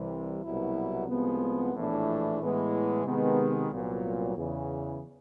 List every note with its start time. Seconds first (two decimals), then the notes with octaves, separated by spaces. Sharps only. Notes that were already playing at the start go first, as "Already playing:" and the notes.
Already playing: C2 C3 E3 G3
0.42 C2 B2 F#3 B3 E4
1.08 C2 C3 F3 G#3 B3
1.74 A#1 A2 E3 A3 D4
2.38 A2 E3 G#3 B3
3.04 C3 D#3 G#3 B3
3.70 C2 A#2 F#3 B3
4.36 E2 C#3 E3